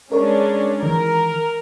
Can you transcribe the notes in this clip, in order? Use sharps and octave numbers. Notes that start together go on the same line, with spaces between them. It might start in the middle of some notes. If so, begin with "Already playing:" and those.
G#3 C#4 D4 A#4 C#5
D#3 E3 A#4